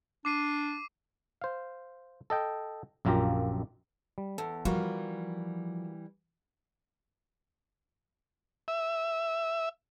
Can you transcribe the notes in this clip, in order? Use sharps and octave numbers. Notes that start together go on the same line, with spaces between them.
D4 D6 C7 D#7
C5 F5
A4 D#5 G5
A#1 F#2 A#3 F4 G4 A#5
G3
E2 A4
E3 F3 G3 F4 F#4 A#4
E5